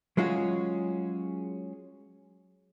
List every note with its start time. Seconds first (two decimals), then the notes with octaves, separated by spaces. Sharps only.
0.17 F#3 G#3 C#4 F4 F#4 G#4